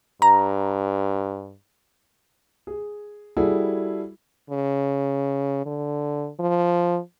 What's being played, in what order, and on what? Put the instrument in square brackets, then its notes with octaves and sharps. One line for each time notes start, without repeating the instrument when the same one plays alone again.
[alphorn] G2 [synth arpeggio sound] A#5
[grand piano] G#4
G3 E4 F#4 G#4 A4
[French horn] C#3
D3
F3